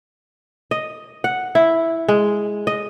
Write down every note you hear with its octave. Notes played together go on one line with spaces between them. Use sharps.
D#5
F#5
E4
G#3
D#5